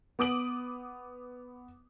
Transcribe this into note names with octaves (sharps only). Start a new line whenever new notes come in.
B3 D6 D#6 D7 F#7